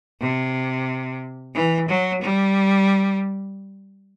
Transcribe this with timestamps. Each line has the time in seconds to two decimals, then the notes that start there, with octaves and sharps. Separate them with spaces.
0.21 C3
1.55 E3
1.88 F#3
2.22 G3